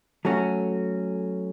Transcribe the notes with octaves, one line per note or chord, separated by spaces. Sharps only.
F#3 A3 C#4 F#4